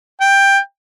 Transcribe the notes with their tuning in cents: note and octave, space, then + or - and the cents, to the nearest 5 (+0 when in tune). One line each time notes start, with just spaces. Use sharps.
G5 +10